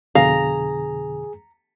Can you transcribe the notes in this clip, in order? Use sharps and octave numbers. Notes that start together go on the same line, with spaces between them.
F2 B2 D3 G#4 F5 A#5